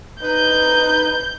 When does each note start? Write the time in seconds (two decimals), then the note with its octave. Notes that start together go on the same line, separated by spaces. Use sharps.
0.22 D#4 B4 G6